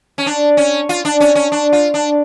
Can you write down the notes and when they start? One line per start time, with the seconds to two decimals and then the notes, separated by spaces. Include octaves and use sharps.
0.18 C#4
0.26 D4
0.57 C#4
0.89 F4
1.05 D4
1.20 C#4
1.35 C#4
1.52 D4
1.73 F4
1.94 D4